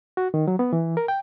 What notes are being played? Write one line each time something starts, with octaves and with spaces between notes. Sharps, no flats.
F#4
D#3
F#3
B3
E3
A#4
G5